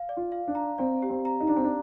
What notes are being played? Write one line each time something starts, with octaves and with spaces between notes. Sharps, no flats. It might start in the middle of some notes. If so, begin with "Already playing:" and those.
Already playing: F5
D5
F4
F5
D4
A#5
C4 D5
G4
C4
A#5
D#4
D4 A#5
C4
D4